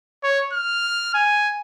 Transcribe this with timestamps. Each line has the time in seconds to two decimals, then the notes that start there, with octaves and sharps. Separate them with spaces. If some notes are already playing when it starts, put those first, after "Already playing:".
0.24 C#5
0.53 F6
1.15 G#5